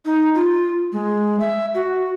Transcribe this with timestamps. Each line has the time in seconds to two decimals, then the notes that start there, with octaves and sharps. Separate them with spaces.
0.05 D#4
0.35 F4
0.93 G#3
1.40 E5
1.74 F#4